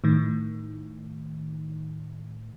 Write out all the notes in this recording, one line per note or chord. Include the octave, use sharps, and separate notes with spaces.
A2 D#3